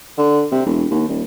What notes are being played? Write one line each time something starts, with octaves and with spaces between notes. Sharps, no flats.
D3
C3
E1
D#2
D#1